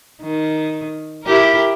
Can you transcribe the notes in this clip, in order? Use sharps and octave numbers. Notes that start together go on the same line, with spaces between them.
D#3
E4 G4 A#4